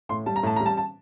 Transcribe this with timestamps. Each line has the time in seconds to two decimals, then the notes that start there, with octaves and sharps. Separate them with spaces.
0.09 A2 C6
0.26 G3 A5
0.36 A#5
0.43 A2 A5
0.56 G3 A#5
0.66 A5
0.77 A5